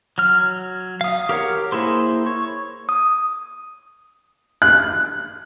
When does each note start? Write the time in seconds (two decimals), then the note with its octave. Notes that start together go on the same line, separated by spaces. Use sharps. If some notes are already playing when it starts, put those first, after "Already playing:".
0.18 F#3 F6
1.01 F5 D#6
1.29 G4 A#4 C#5 F#5
1.72 A#3 E4 G#4 C5
2.26 C#5
2.89 D#6
4.62 F#6